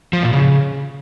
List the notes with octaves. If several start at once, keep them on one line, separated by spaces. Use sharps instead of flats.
F3
A#2
C#3